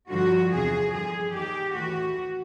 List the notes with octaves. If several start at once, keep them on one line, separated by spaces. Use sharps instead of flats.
G2 D3 F3 F#4
E2 C3 F3 G#4
G2 D3 F3 G#4
D#2 D#3 G4
A2 E3 F#4